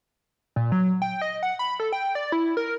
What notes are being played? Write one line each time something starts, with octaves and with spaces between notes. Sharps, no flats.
A#2
F#3
G5
D#5
F#5
B5
A4
G5
D5
E4
A#4